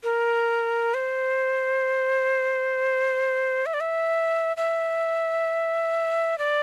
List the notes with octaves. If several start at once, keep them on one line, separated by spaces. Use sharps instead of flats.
A#4
C5
E5
D5
E5
E5
D5